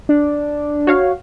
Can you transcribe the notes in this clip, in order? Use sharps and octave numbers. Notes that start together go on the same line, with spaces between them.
D4
F#4 C#5 F5